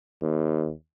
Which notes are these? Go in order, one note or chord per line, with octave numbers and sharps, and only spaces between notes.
D#2